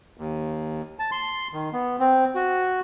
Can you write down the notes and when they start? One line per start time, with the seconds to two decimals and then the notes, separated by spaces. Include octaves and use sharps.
0.18 D#2
0.99 A5
1.12 C6
1.53 D#3
1.73 B3
2.00 C4
2.35 F#4